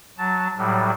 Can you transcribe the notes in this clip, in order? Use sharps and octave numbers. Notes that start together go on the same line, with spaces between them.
F#3 A5
A2 F#3 G3